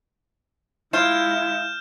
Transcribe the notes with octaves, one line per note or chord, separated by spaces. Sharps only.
G#3 E4 F4 F6 G6 E7